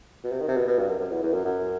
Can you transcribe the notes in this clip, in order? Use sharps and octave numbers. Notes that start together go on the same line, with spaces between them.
B2
C3
D#3
C3
B2
B2
G2
F#2
F#2
E2
E2
F#2
F#2